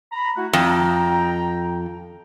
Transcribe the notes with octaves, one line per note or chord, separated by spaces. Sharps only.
A#5 B5
A3 E4 F#4
F2 G5 A#5